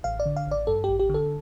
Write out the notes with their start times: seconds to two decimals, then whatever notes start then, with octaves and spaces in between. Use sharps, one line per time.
0.04 A1 F5
0.20 D5
0.26 D3
0.37 F5
0.47 A1 D5
0.67 G2 A4
0.84 A1 G4
1.00 G4
1.10 D3 A4